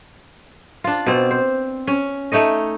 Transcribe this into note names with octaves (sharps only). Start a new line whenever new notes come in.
D4 F4
B2 C4
C5
C#4
A3 D#4 C#5 D#5